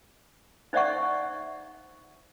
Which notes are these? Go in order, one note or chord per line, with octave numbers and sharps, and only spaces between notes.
D#4 C5 D5 E5 F#5 C#6